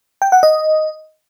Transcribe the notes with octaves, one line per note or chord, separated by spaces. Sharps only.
G5
F#5
D#5